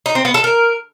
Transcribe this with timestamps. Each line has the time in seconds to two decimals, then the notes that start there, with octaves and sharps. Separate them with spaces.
0.06 D#4
0.15 C4
0.25 B3
0.34 A4
0.44 A#4